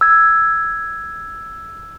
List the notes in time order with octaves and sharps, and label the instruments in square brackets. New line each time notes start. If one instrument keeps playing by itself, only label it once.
[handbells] E6 G#6